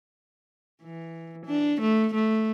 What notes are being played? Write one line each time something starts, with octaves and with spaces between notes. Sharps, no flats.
E3
D4
A3
A3